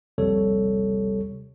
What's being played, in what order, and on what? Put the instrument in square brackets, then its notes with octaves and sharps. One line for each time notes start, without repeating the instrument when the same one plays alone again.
[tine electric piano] A#1 D#2 C3 G3 A4 C#5